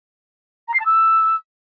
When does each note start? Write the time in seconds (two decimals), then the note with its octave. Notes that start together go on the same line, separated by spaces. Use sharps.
0.67 A#5
0.73 C7
0.79 A5
0.85 E6